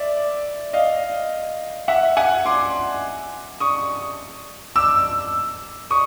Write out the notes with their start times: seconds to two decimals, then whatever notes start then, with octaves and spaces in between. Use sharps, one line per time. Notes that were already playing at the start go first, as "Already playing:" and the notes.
Already playing: D5 E5
0.73 D#5 F5
1.88 E5 F#5
2.17 F#5 G#5
2.46 C6 D6
3.60 C#6 D#6
4.76 D6 E6
5.91 C#6 D#6